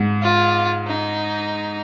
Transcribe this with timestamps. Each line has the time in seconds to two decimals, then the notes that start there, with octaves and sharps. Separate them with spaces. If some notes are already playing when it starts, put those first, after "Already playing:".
Already playing: G#2
0.22 F4
0.87 D#4